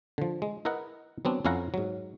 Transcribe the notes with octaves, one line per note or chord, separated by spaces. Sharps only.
D3 F3
G#3
E4 A#4 B4 D#5 F#5 A#5
F#3 B3 C4 D4
F2 C#4 E4 F5 F#5 A#5
G#2 F#3